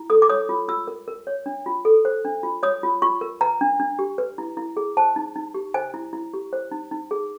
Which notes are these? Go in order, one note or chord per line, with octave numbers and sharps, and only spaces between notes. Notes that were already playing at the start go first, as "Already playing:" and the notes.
Already playing: E4
A4 D#6
D6
C#5 D#6
F4
F4 E6
A#4
A#4
C#5
D4
F4
A4
C5
D4
F4
C#5 D#6
F4
F4 C#6
A#4
B4 A#5
D4
D4
G4
B4
E4
E4
G#4
C5 A5
D#4
D#4
G4
C5 G#5
E4
E4
G4
C5
D#4
D#4
G#4